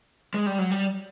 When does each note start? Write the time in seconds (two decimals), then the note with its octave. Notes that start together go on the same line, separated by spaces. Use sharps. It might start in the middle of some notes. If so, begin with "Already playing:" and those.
0.34 G#3
0.46 G3
0.58 F#3
0.71 G3